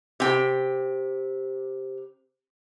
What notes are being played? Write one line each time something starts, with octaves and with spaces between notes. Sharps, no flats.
C3 G5